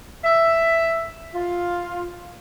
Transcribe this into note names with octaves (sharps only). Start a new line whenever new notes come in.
E5
F4